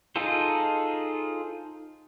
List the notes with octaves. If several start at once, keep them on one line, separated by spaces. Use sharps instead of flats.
D#4 F4 G#4 A4 C5